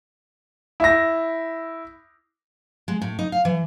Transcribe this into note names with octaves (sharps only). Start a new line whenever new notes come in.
E4 A#6
G#3
A2
D#4
F5
E3